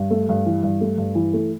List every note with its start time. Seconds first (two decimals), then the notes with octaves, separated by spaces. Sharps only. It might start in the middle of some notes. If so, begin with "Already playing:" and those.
Already playing: G2
0.10 A3
0.29 G2
0.46 E3
0.63 G2
0.81 A3
0.98 G2
1.15 E3
1.33 A3